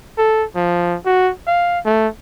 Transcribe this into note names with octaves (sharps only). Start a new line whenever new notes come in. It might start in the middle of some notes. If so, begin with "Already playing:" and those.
A4
F3
F#4
F5
A3